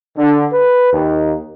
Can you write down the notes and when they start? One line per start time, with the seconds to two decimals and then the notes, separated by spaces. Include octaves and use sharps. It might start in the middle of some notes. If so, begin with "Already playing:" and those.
0.16 D3
0.52 B4
0.92 D#2